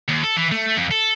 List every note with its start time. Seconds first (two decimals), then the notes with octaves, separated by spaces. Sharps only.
0.08 D#2
0.23 A4
0.36 E3
0.51 A3
0.77 F2
0.91 A4